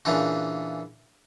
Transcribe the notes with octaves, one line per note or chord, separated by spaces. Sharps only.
A#2 C#3 E3 D4 F#4